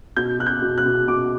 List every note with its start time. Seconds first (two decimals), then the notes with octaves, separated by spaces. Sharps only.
0.17 B2 G6
0.39 B2 F#6
0.46 G6
0.62 B2
0.78 F#6
0.85 B2
1.08 B2 D6